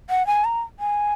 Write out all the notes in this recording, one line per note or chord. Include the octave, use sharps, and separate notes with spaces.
F#5
G#5
A#5
G#5